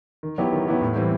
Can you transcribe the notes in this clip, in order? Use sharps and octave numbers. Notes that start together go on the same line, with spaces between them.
D#3
F#3 B3 E4 G4
D#3
F#3 B3 E4 G4
A2
E3 G3 C4